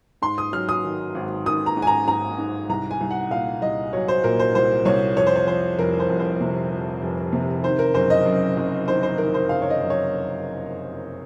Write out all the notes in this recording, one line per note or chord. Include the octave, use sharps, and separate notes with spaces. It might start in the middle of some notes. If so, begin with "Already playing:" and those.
G#2 C6
D#6
F#3 F6
D#6
D#3
G#1
D#3 D#6
A#5
G#2
G#5
A#5
G#2 A#5
G#2
C2 A#5
G#5
C2
F#5
A#2 F5
C2 D#5
F#3 C#5
C5
A#2 A#4
C5
C2 C5
C2 C#5
F2 C#5
C5
C#5
F3 C5
F1 A#4
C5
F2
C5
C3
F3
F1
C3
D#3 C5
A#4
F#1 C5
D#5
F#2
F#1
D#3 C5
C5
D#3 A#4
C5
F#1 F5
C#5
D#5
F#2
C#5